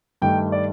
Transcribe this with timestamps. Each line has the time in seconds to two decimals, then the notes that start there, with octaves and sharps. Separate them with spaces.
0.22 G2 D#3 A3 G5
0.52 D5